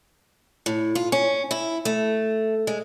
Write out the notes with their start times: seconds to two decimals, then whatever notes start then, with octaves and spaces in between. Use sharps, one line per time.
0.66 A2
0.95 F4
1.12 C#4
1.51 E4
1.85 A3
2.67 G#3